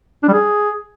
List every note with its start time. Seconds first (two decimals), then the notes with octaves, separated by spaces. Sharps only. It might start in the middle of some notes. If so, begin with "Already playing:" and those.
0.23 D4
0.28 G3
0.33 G#4